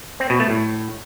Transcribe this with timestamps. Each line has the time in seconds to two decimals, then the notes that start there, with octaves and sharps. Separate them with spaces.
0.20 C4
0.30 B2
0.40 A3
0.50 A2